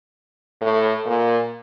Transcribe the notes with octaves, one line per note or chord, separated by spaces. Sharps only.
A2
A#2